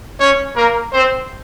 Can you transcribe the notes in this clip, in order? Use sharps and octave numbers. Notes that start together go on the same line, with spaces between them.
C#4 C#5
A#3 A#4
C4 C5